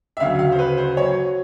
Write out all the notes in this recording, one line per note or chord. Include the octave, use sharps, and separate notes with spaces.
E5
D2 C#3 F#3 F5
F5
C5
B4
C5
F#3 C#5